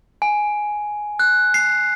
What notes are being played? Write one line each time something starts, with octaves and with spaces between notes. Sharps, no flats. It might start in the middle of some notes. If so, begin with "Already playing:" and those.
G#5
F#6
C7